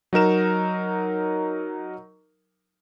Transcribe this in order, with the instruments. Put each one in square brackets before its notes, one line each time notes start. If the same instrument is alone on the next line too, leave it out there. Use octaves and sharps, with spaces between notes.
[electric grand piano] F#3 D#4 A#4 E7